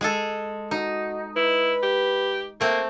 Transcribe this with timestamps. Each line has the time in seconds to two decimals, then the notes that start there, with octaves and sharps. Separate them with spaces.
0.01 G#3 G#4 A4
0.71 D#4 F#4
1.36 E4 B4
1.83 G4
2.61 A3 A#3 C4